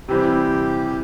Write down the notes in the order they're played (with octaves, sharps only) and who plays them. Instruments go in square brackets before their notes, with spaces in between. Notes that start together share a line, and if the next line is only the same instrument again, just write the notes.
[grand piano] C3 E3 G3 C4 [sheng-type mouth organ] G4